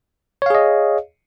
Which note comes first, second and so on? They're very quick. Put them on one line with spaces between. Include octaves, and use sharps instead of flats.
C#5 F5 G#4 D#5